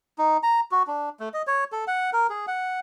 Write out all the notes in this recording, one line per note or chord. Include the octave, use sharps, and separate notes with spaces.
D#4
A#5
F#4
D4
A3
D#5
C#5
A4
F#5
A#4
G#4
F#5